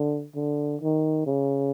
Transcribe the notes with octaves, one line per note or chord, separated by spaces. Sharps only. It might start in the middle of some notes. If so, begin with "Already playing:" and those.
Already playing: D3
D3
D#3
C#3